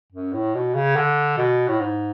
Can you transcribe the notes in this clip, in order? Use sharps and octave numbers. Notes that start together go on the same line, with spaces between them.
F#2
A2
B2
C#3
D3
B2
A2
G#2